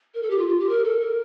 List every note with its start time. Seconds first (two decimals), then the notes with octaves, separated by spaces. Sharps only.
0.14 A#4
0.22 A4
0.30 G4
0.38 F4
0.48 F4
0.59 G4
0.69 A#4
0.84 A4
1.00 A#4